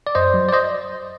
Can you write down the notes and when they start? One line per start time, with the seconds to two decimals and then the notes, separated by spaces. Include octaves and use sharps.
0.07 D5
0.15 F#2 C5 D#5
0.34 F#3
0.49 D5
0.53 C5 D#5